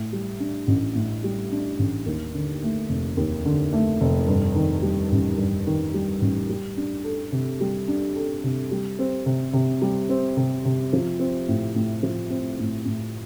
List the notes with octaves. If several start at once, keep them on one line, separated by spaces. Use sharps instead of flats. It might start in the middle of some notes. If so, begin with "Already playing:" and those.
Already playing: A2
G3
D4
A1
A2
G3
D4
A1
D#2
D3
A3
F1
D#2
D3
A3
F1
G2
D#3
G3
A1
G2
D#3
G3
A1
G3
D4
A4
C3
G3
D4
A4
C3
G3
C4
C3
C3
G3
C4
C3
C3
F3
C4
A2
A2
F3
C4
A2
A2